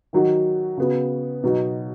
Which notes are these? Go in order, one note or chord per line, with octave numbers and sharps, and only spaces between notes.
D#3 F#3 D#4 F#4
C#3 B3 F#4
B2 F#3 D#4